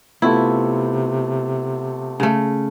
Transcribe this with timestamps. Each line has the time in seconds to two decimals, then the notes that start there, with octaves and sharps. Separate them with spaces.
0.22 C3 A3 B3 E4 F4
2.20 C#3 A3